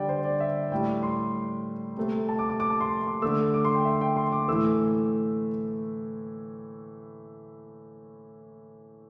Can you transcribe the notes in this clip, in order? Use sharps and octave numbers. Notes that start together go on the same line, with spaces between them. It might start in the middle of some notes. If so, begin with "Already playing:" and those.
Already playing: D3 G3 D5 G5
C5
D5
E5
A2 G3 G5
C6
C3 A3
A5
D6
D6
D6
A5
C6
D6
D3 A3 E6
D6
C6
G5
E5
G5
C6
D6
A2 E3 A3 E6